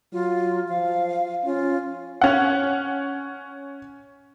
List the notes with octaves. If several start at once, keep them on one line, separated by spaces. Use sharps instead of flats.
F#3 F4
F3 F5
C#4 F4
C#4 F#5